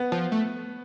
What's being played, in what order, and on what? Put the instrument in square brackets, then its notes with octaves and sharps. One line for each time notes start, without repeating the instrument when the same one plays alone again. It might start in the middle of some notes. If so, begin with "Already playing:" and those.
Already playing: [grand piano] B3
[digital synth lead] F3
A3